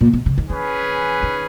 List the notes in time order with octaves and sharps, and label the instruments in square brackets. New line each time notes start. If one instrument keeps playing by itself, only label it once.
[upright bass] A#2
B2
C#3
D#3
[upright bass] E3 [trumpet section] C#4 G#4 B4
[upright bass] D#3